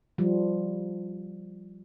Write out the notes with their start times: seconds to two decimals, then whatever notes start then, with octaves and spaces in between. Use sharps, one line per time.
0.18 F3 G3